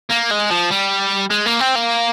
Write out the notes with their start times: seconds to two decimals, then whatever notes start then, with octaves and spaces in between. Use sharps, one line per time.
0.10 A#3
0.30 G#3
0.50 F3
0.71 G3
1.31 G#3
1.46 A#3
1.60 C4
1.76 A#3